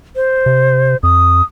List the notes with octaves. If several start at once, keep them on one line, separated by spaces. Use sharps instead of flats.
C5
C3
F2 D#6